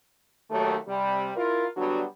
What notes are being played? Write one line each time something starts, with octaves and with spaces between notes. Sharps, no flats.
D#2 F#3 A3
C3 G3
E4 F4 A#4
D3 F#3 G3 B3 D4 F#4